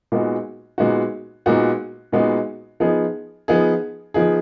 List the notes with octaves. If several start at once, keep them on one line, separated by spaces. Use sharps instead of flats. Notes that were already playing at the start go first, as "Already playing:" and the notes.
A#2 G#3 B3 D#4 F#4
A#2 G#3 B3 D#4 F#4
A#2 G#3 B3 D#4 F#4
A#2 G#3 B3 D#4 F#4
F3 B3 D#4 G#4
F3 B3 D#4 G#4
F3 B3 D#4 G#4